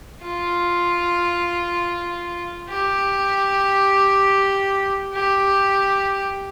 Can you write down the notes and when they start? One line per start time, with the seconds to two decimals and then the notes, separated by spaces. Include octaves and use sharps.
0.23 F4
2.69 G4
5.14 G4